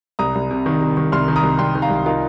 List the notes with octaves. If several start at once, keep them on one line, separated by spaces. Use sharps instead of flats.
C2 A#5 D#6
C2
C3
D#3
C3
D#3
C2 C6 F6
D#3
A#5 D#6
C2
C2 G5 C6
D#3
F5 A#5
C2
D#4 F4 A#4